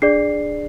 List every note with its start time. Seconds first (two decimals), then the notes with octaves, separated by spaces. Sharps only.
0.02 D4 G#4 D5 C7